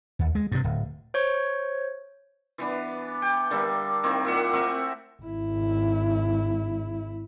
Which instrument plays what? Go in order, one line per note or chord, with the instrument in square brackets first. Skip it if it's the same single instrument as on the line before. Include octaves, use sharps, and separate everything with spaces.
[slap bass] D#2
G#3
G2 C3
D1
[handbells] C5 C#5 C#6
[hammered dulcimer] E3 B3 D4
G5
D3 G3 A#3 A4
D#3 A#3 C4 E4
A#2 E5 F#5
A3 C4 A#4 E5
[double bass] G#1 E4